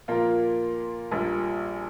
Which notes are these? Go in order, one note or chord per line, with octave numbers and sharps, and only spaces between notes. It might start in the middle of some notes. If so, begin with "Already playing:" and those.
A#2 F3 A#3 F4 A#4
A#1 A#2 G3